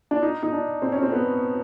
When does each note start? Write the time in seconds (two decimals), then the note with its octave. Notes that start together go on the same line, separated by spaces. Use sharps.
0.11 D4
0.23 D#4
0.43 D#4
0.53 D4
0.82 C4
0.92 C#4
1.03 C4
1.12 B3